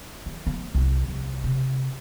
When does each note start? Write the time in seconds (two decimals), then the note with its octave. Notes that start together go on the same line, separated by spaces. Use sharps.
0.26 D#3
0.47 A3
0.75 C2
1.08 C2
1.44 C3